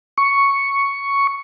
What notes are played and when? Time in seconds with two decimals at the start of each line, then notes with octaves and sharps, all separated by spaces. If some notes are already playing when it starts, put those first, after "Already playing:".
0.18 C#6